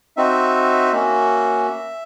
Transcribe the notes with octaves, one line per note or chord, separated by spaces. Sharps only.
C4 D#4 F#4 E5
A#3 C#4 F#4